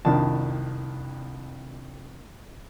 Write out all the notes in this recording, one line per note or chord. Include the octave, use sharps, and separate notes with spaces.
C2 F2 D#3 D4 A5